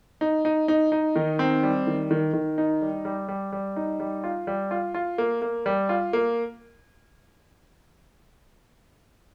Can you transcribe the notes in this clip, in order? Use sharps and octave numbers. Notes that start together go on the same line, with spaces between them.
D#4
D#4
D#4
D#4
D#3
C4
G3
D#3
D#3
D#3
D#4
G3
G3
G3
G3
D#4
G3
F4
G3
F4
F4
A#3
A#3
G3
F4
A#3